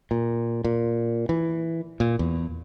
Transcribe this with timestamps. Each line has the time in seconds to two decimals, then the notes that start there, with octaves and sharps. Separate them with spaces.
0.11 A#2
0.64 A#2
1.29 E3
2.00 A#2
2.19 E2